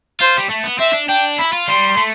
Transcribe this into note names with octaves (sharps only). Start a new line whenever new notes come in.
F4 C5
G3
A3
B3
C4 E5
D4
D4 G5
E4 B5
F4
G3 C6
A3